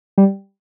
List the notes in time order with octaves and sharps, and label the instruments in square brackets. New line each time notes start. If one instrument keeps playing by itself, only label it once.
[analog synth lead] G3